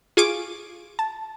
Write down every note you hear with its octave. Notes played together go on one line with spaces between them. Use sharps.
F4 G#4 G#5 C#6 D6
A5